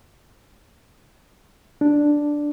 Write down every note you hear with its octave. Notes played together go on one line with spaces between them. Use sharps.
D4